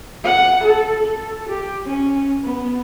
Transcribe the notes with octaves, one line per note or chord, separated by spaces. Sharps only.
F#5
A4
A4
G4
C#4
B3